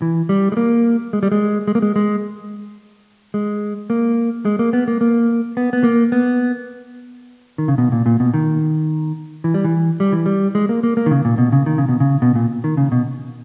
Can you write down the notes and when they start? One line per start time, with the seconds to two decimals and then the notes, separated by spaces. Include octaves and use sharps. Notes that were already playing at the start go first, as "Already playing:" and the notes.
0.02 E3
0.29 G3
0.52 G#3
0.57 A#3
1.13 G#3
1.23 G3
1.32 G#3
1.68 G#3
1.75 A#3
1.82 G#3
1.96 G#3
3.34 G#3
3.90 A#3
4.45 G#3
4.59 A#3
4.73 B3
4.88 A#3
5.01 A#3
5.57 B3
5.73 B3
5.83 A#3
6.12 B3
7.58 D#3
7.68 C#3
7.78 B2
7.92 A#2
8.06 A#2
8.20 B2
8.34 D#3
9.44 E3
9.54 G3
9.65 E3
10.00 G3
10.12 E3
10.26 G3
10.55 G#3
10.69 A#3
10.83 A#3
10.97 A#3
11.06 D#3
11.11 C#3
11.25 A#2
11.38 B2
11.52 C#3
11.66 D#3
11.78 C#3
11.89 B2
12.00 C#3
12.22 B2
12.35 A#2
12.64 D#3
12.77 C#3
12.92 B2